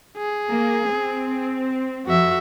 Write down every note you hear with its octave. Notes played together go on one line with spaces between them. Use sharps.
G#4
A#3
C4
F2 F3 F#4 E5